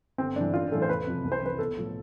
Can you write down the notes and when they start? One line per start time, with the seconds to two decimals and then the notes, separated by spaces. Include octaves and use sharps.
0.18 G1 C4
0.36 G2 E3 D4
0.53 A1 F4
0.71 A2 E3 A4
0.82 C5
0.88 F1 B4
1.07 F2 C3 F3
1.24 C2
1.32 C5
1.41 C3 E3 B4
1.58 B1 A4
1.77 A2 F3